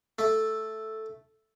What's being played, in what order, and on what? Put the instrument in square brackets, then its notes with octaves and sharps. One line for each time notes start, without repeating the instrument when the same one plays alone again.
[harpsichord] A3